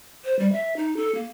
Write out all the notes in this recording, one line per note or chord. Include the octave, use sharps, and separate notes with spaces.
C5
G3
E5
D#4
A4
A#3